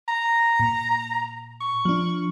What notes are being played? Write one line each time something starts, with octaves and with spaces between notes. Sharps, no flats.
A#5
A#2
C#6
F3 D4